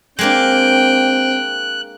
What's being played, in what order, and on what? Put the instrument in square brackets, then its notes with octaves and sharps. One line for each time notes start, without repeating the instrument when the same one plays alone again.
[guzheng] G#3 A#3 D4 [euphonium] C4 [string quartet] G5 [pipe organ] F#6